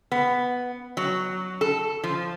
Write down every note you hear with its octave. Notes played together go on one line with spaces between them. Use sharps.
B3
F#3
A4
F3